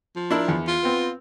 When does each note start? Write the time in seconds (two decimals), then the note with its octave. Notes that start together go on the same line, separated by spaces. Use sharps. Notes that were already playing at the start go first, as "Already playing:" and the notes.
0.16 F3
0.31 D4 E4 A#4
0.48 E2
0.68 F4
0.83 B3 C4